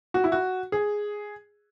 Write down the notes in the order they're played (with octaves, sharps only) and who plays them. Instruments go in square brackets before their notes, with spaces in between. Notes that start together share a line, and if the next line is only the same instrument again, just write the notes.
[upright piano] F#4
E4
F#4
G#4